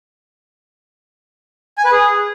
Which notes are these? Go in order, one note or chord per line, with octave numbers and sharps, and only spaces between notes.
G#5
B4
G#4